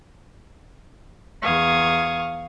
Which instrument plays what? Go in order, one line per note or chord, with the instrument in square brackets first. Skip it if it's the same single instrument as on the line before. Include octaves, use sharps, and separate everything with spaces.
[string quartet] E2 D#6 G#6 [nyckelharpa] F5 C#6